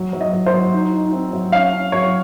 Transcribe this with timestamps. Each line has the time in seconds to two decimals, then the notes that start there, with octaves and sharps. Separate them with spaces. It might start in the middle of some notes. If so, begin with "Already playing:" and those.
Already playing: F#3
0.13 F#3
0.21 D#5
0.33 F#3
0.46 C5
0.54 F#3
0.74 D#4
0.93 D#4
1.13 C4
1.33 F#3
1.52 C#4 F5
1.73 C#4
1.92 F#3 C#5